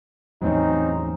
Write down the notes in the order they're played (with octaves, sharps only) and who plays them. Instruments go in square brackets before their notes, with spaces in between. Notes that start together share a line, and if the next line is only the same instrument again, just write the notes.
[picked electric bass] E2 A2 F#3 [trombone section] C4 C#4 D#4